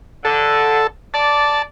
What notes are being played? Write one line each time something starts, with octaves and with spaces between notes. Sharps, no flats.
D3 A4
D5 A5